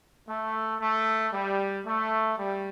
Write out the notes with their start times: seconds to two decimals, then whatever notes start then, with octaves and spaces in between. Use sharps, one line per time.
0.27 A3
0.80 A3
1.33 G3
1.86 A3
2.39 G3